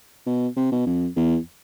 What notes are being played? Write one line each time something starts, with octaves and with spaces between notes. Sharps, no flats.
B2
C3
B2
F2
E2